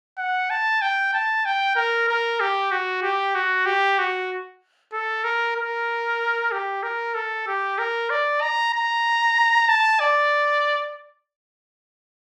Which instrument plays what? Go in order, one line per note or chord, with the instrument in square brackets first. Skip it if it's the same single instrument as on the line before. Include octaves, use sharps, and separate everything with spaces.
[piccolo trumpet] F#5
A5
G5
A5
G5
A#4
A#4
G4
F#4
G4
F#4
G4
F#4
A4
A#4
A#4
G4
A#4
A4
G4
A#4
D5
A#5
A#5
A5
D5